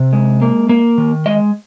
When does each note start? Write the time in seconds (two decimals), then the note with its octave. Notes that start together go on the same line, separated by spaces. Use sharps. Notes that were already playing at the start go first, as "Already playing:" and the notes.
Already playing: C3
0.13 G#3
0.42 A#3
0.69 A#3
0.98 D#3
1.26 G#3 D#5